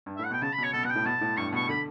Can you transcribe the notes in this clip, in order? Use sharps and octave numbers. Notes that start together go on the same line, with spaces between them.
G2
A2 E5
F#5
B2 G5
C#3 A5
B5
B2
C#5
B2 A4
B2 F#5
G5
A2
B2 A5
A2
G2 C#6
B2
C#6
D3 B5